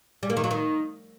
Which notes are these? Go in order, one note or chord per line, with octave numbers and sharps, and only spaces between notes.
G3
A#3
D#3
F#3
D#3